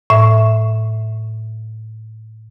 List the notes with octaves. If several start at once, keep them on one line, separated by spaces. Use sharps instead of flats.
A2 E5